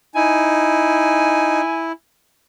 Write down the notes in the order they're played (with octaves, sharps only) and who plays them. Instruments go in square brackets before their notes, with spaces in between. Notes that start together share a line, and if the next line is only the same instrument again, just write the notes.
[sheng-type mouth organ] D#4 [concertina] E4 [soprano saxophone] G#5